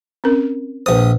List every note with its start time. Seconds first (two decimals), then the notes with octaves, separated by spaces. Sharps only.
0.24 C4 C#4 A#4
0.86 A#1 B4 C5 D#6